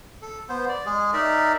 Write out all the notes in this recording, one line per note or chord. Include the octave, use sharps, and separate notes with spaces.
A4
B3 C5
D5
G#3 G#4
D#4 A#4 D5 E5